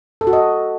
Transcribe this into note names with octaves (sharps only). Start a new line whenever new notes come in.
A4
F#4
D#5